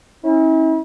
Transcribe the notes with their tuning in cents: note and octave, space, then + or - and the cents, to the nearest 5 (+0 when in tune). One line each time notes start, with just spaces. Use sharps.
C#4 -35 E4 -40